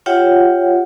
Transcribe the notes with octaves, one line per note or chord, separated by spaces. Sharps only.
F4 G4 C#5 E5 F#5 G5